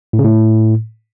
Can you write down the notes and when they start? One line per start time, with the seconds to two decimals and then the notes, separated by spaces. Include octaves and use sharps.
0.13 A2
0.19 C#3
0.24 A2